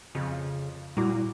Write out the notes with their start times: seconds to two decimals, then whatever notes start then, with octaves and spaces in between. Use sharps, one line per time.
0.15 F2 C#3
0.97 A#2 G3 E4 F#4 A#5 D6